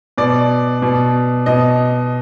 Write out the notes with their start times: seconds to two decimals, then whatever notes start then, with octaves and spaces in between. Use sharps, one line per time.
0.18 B2 D5
0.82 B2
1.46 B2 D#5